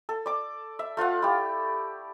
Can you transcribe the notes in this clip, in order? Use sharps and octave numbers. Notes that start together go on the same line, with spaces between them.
A4
D5 D6
E5
A3 F4 F5 F#5
E4 G4